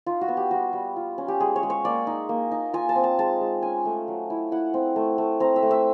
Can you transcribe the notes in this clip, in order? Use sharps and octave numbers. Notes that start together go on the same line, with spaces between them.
D#4 F4
F#4
B3
G4
G3 F#4
G3
F4
C#4
G4
G#3 G#4
C#5
G#3
C#5
A#3 D5
D#4
A#3
D#4
F4 G#5
A5
C4
A5
G#3 A5
G#3
C#4 G#5
A3
F#3
E4
E4 F#5
C4
A3
A3
C4 A#5
E5
A3
E5